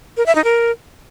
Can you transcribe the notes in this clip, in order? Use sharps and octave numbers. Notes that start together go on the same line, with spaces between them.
A#4
E5
D#4
A#4